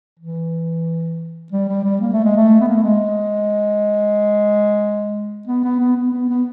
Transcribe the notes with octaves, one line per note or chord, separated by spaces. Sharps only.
E3
G3
G3
G3
A#3
A3
G#3
A3
B3
A#3
A3
G#3
B3
B3
B3
B3
B3
B3